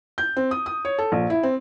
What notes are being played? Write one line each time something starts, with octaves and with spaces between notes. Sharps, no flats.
G6
C4
D#6
D#6
C#5
A4
A#1
E4
C4